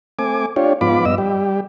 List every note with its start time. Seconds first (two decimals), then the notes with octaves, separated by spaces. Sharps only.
0.19 A3 C4 G#5 D6
0.56 D4 F4 G4 C#5
0.81 G#2 F3 B3 F4 B5 D6
1.05 G2 B3 D#5 E6
1.18 G3 G4